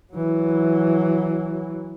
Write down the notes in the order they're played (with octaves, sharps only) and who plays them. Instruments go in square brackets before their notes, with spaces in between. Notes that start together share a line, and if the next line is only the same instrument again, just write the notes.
[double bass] E3 F#3